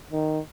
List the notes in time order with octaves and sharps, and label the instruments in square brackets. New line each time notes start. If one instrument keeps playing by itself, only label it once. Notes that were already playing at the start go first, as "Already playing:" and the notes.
[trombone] D#3